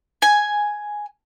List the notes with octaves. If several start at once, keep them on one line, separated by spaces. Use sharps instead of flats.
G#5